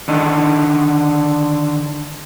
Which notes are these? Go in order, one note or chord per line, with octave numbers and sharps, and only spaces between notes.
D3 D#3 D4 D#4